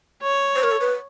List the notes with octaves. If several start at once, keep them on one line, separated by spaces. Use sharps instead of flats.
C#5
C5
A#4
A4
B4